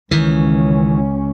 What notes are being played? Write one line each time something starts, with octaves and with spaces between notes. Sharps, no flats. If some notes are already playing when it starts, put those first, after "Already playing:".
C#2 D#3 E3 C#4